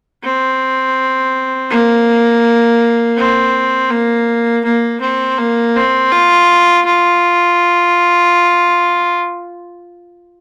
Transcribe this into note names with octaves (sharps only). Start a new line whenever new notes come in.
C4
A#3
C4
A#3
A#3
C4
A#3
C4
F4
F4